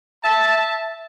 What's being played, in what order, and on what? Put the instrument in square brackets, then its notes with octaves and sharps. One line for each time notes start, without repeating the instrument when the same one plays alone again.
[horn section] E5 A5